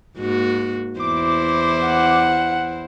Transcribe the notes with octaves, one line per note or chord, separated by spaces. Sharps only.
G#2 A#3 F#4
E2 E4 C5 D6
F#5